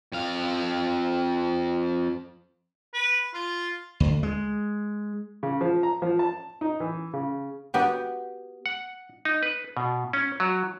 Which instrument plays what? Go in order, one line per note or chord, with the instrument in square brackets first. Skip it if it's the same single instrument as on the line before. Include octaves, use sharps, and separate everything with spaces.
[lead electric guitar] F2 F5
[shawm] B4
F4
[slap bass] D2
G#3
[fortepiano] C#3
F3
A#5
F3
A5
D#4
E3
C#3
[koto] B3 F#4 G4
[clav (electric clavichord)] F#5
D#4
B4
B2
C#4
F#3